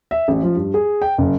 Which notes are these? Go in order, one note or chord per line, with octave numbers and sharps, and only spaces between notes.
E5
A1
F3
G2
G#4
G5
F#1